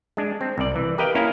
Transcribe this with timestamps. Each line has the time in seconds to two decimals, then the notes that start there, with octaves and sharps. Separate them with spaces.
0.17 G#3 D4
0.41 C4
0.58 C2 D5
0.76 E3
0.98 G4 A#4 B4 D#5 F5 G5
1.15 A#3 C#4 E4 A#4 F5